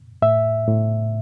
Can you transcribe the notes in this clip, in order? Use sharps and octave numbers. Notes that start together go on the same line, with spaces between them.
A2 E5
A2